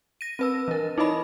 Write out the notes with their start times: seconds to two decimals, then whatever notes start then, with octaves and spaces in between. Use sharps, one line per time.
0.21 A#6 D#7
0.39 C4 B4 E6
0.68 E3 A#4
0.98 D#4 E4 B4 D#5 B5